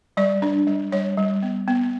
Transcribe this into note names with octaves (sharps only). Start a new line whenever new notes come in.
G3 D5
D4
G3
G3 C#5
G3
B3
B3